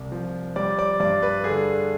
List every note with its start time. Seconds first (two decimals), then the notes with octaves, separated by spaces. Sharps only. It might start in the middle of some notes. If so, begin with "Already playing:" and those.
Already playing: C2
0.12 F3
0.56 G3 D5
0.79 D5
1.00 G2 D5
1.22 B4
1.44 D3 G#4